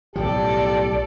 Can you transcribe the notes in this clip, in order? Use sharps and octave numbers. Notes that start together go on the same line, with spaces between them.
B1 A2 F3 G4 A4 D5